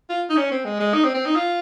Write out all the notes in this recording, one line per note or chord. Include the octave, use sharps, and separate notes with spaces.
F4
D#4
C#4
C4
G#3
G#3
D#4
C4
C4
D#4
F4